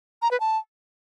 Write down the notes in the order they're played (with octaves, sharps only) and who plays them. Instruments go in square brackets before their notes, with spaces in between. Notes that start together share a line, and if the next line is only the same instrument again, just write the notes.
[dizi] A#5
B4
A5